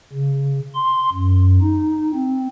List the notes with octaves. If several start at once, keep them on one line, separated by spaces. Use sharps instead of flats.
C#3
C6
F#2
D#4
C4